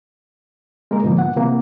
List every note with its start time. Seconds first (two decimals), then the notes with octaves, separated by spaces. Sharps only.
0.91 G#3 A#3 A#4
1.04 G#2 B2 D3 F3 A#3
1.18 F#5
1.36 C3 E3 A#3